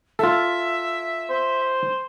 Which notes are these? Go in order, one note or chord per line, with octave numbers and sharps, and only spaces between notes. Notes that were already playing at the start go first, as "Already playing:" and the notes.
F4 A4 E5
C5